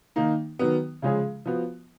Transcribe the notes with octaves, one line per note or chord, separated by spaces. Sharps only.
D#3 A#3 D#4
D#3 F#3 B3
C#3 F3 G#3 C#4 G#4
F3 B3 F#4